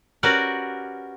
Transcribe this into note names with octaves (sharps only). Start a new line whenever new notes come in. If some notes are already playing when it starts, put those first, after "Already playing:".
C#4 F#4 G4 A#4 B4 D5